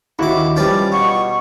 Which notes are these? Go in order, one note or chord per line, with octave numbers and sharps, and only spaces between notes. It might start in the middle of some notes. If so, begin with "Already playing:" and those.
D#2 E4 F#4 D6
F3 G3 C#4 B4 D5
B2 C#6